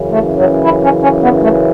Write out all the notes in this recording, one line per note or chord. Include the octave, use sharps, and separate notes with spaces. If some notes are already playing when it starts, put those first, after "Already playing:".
Already playing: F#2 C#3 E3
A3
F#3
E4
C#4
C#4
B3
A3